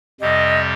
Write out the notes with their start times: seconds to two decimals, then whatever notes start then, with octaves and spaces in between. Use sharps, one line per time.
0.21 F2 C3 G3 C4 G4 D#5